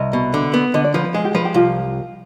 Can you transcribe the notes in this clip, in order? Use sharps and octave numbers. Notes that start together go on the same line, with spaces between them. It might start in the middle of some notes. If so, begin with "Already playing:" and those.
Already playing: C2 D#5
B2
D3
B3
D3 D#5
D5
F3 B4
B4
G#3 G#4
G4
F3 B4
G4
C2 F4